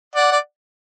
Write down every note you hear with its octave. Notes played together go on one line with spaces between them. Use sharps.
D5 F#5
D5